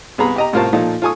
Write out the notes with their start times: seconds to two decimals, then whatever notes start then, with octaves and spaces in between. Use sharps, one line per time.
0.18 C2 B3 G#4 A#5 B5
0.36 G4 D#5 A#5
0.53 C2 A2 F4 A#4 C5 A5
0.73 A#2 F3 D#4 A4
1.02 F4 A4 G#5 C#6 D#6